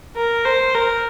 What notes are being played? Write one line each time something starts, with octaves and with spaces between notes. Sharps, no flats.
A#4
C5
A#4